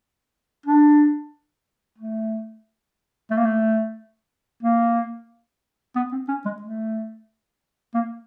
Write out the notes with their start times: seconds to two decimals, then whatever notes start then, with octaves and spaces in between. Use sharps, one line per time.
0.66 D4
1.98 A3
3.31 A3
3.37 A#3
3.45 A3
4.63 A#3
5.96 B3
6.12 C4
6.28 C#4
6.45 G#3
6.62 A3
7.94 A#3